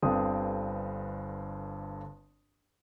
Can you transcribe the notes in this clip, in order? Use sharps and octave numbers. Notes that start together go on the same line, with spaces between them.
G1 G2 D3 C4 D#6